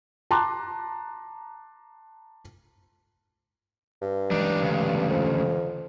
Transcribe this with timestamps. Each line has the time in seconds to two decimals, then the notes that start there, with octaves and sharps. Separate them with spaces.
0.31 A5 A#5 C6 D6 F#6
4.02 G2
4.31 E3 F#3 G#3 D4 D#4
4.63 D2 C#3
5.10 F2